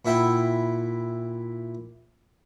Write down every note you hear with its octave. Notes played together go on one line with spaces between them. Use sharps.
A#2 E4 E5 F#5 G5